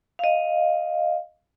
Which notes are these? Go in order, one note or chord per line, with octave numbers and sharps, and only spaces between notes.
D#5 F5